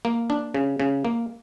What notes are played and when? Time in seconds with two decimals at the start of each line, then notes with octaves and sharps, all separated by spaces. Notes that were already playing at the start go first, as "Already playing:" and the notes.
0.05 A#3
0.30 D4
0.54 C#3
0.80 C#3
1.05 A#3